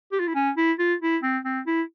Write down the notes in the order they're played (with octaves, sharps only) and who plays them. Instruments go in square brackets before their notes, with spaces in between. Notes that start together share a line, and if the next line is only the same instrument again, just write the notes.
[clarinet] G4
F4
E4
C#4
E4
F4
E4
C4
C4
E4